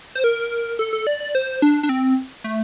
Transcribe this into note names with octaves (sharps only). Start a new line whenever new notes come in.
C5
A#4
A4
A4
D5
D5
C5
D4
D4
C4
A3